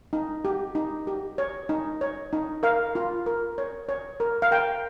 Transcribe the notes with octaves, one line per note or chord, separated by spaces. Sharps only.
D#4
G4
D#4
G4
C#5
D#4
C#5
D#4
A#4 F5
F4
A#4
C#5
C#5
A#4
F5
A#4 G5